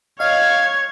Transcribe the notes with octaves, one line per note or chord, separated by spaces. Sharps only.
C#5 D#5 F5 G#6